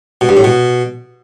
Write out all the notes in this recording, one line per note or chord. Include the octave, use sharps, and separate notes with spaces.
B2
G2
A2
B2